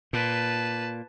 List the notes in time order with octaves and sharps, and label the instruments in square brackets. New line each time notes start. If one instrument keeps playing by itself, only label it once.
[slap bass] A#2 [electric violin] B4 A5